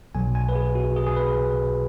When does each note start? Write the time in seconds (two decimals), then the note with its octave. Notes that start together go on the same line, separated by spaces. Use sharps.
0.15 B1 B2 F#3 G#5
0.35 G#5
0.49 B4
0.55 G#4
0.75 F#4
0.96 G#4
1.06 G#4
1.16 B4